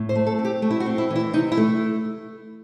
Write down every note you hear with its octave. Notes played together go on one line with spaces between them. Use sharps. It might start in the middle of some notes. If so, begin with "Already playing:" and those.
Already playing: A2
C5
A3
A4
C4
G4
A3
E4
F#4
C4
E4
E3
E4
C3 D#4
E4
A3